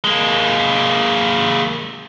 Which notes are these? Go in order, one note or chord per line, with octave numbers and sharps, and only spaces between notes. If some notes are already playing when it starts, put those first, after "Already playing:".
G#3 A#3